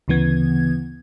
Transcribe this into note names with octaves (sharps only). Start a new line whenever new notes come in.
D2 C#3 E3 B3 G#6